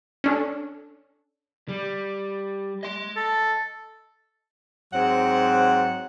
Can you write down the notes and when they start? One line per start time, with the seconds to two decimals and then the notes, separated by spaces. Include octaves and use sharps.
0.24 C#4 D4 A4
1.68 G3
2.83 D#5 C6
3.16 A4
4.94 G#2 F#3 C4 F#5